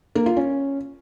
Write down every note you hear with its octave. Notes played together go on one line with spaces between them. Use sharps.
A#3
F4
C#4